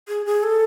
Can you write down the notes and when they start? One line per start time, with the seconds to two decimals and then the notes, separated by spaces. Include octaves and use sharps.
0.08 G#4
0.26 G#4
0.43 A4